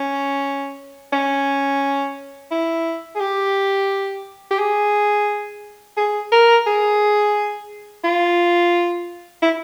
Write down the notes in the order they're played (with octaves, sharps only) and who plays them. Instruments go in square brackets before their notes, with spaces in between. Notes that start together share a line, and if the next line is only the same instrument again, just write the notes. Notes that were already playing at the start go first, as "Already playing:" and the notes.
Already playing: [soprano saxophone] C#4
C#4
E4
G#4
G4
G4
G#4
G#4
A#4
G#4
F4
E4